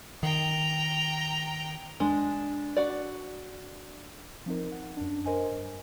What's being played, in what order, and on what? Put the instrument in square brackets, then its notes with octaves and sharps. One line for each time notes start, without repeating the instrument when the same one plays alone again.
[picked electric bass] D#3 [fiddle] G5 A#5
[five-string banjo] G#3 [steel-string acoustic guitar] D4
[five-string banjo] F#4 D5
[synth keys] F3 C4 D#4 A#4
F#5
F#2 D4
A#4 C5 D#5 G#5
G2